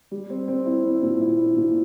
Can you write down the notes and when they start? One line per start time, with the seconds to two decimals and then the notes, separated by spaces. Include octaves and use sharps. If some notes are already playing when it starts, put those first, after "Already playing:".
0.11 G3
0.30 C4
0.48 C4
0.66 E4
0.84 C4
1.03 A#2
1.21 E4
1.39 E4
1.56 A#2